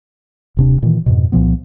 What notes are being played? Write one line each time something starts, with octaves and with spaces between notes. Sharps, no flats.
D#1 C3 D4
A#2 D#3 E3
F2 G#2 B2
C2 A#2 F3 B3